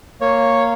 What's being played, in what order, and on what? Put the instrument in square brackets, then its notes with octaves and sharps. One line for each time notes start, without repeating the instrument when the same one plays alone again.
[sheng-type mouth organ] A#3 C#5